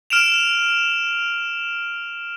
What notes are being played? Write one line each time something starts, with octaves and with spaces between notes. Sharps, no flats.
F6 D7 E7 F7